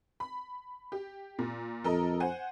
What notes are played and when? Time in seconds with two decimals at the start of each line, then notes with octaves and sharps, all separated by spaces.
0.20 B5
0.92 G4
1.39 A#2
1.84 F2 A4 A#4 D#5
2.20 C5 F#5 G#5